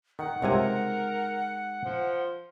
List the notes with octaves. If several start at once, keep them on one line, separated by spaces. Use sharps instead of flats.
D#3 F#5
C#2 C3 G#3 D#4 A#4 G#5
F3